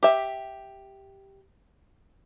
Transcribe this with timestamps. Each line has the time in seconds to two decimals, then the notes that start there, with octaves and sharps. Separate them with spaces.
0.03 G4 E5